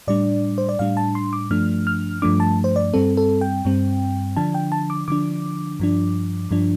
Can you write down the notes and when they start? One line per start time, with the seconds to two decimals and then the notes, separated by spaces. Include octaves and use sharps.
0.08 A2 G3 D4 D5
0.58 C5
0.69 D5
0.79 A2 G3 D4 F5
0.97 A5
1.15 C6
1.33 D6
1.50 G2 F3 A3 D4 F6
1.87 F6
2.22 G2 F3 A3 D4 D6
2.40 A5
2.64 C5
2.76 D5
2.94 G2 G3 C4 A4
3.17 A4
3.41 G5
3.65 G2 G3 C4
4.36 D3 F3 D4 A5
4.54 G5
4.72 A5
4.90 D6
5.08 D3 F3 D4 D6
5.80 G2 F3 D4
6.51 G2 F3 D4